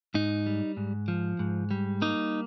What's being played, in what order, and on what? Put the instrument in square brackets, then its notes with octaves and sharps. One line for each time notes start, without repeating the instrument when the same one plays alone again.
[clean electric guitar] G#2 D#4
G3
G#2
F3
G#2
G3
A#3 D#4